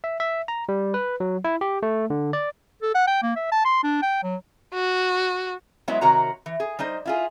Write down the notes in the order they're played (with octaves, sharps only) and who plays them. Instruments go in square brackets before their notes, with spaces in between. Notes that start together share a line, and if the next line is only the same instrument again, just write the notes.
[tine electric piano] E5
E5
A#5
G3
B4
F#3
E4
G4
A3
D3
D5
[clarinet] A4
F#5
G5
A#3
E5
A5
C6
D4
G5
F#3
[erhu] F#4
[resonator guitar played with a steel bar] F#3 G#3 B3 E4 C#5 E5
C3 D#3 F#4 A#4 C#5 A#5
E3
G#4
G3 D#4 C5 D#5
E4 F4 G#4